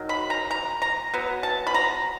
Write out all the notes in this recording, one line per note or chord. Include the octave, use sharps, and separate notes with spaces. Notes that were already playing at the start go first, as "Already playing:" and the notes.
Already playing: D#3 F#3
B5
A#5
A#5
A#5
F#3 B3
A5
B5
A#5